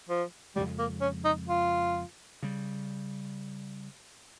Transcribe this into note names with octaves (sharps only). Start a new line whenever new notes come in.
F3
F2 C#3 G3 G#3
A#3
C#4
D#4
F4
C#3 G3